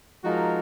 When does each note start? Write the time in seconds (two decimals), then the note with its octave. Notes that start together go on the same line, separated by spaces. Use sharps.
0.24 F3 G#3 D#4 F#4 A#4